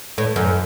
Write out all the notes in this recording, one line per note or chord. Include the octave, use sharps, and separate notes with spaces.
A2
F#2